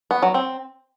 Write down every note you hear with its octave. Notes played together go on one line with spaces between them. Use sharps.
B3
F#3
C4